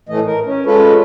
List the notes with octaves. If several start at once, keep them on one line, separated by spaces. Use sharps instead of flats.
A2 E3 A3 D#5
A#4
C#4
G#3 C#4 F4 A4 B4